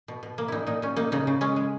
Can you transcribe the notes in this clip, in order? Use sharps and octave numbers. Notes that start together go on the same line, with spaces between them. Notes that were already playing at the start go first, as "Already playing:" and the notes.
B2
B2
A#3
A#2 D#4 E4
A#2 D#4
A#2 C#4
A#3 D#4
C#3 D#4
C#3
G#3 C#4
G#3